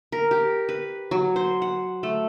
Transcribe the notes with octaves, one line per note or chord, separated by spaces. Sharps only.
A#4
G4
B4
F#3
C5
F#5
A3